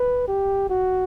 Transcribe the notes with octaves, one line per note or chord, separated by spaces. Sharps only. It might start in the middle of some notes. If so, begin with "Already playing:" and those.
Already playing: B4
G4
F#4